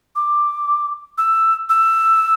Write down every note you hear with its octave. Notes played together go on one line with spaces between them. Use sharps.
D6
E6
E6